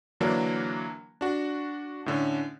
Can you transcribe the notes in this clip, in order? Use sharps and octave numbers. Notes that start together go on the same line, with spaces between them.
D3 E3 F#3 A#3 D4
D4 F#4
A2 D3 C#4